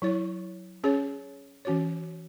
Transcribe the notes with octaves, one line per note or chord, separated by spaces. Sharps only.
F#3 E4 C#5
C#4 G#4 C#5
E3 C#4 F#4 C#5